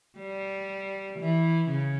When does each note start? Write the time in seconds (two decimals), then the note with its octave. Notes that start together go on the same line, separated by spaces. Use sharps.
0.18 G3
1.19 E3
1.69 C#3